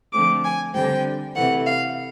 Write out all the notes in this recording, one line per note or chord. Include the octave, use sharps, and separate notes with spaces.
D3 F3 A3 C4 D6
G#5
D3 G3 C4 G5
C3 E3 A3 F#5
F5